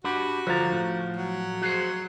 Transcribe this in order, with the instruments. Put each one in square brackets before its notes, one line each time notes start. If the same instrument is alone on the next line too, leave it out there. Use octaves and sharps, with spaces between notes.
[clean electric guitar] D4 G4 B5 [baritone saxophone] F#4
[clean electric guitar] D3 A#5 [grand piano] F3 A6
[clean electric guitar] A2
[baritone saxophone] F#3
[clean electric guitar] F#4 G#4 C5